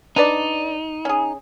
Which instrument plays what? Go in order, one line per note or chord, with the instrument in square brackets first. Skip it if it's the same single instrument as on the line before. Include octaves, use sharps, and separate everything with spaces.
[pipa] D4 B4 D5 [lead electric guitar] D#4
[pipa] C#4 G#4